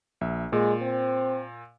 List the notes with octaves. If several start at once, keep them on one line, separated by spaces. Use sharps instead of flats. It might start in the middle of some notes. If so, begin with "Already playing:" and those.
A#1 E5
A#2 G#3
C4